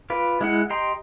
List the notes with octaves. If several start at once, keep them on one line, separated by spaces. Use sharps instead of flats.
F4 B4 D5
G#3 E4 F#5
G4 D#5 G5 A#5 C6